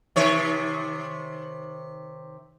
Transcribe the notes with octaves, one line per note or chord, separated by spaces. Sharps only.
C3 D#3 C#5